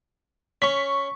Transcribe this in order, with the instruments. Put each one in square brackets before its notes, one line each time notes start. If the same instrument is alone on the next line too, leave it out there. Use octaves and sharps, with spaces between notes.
[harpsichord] C#4 [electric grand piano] C#6 B6